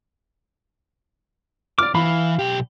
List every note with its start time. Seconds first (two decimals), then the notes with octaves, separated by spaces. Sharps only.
1.78 D5 D6 F6
1.95 E3 F5 B5
2.39 B1 G4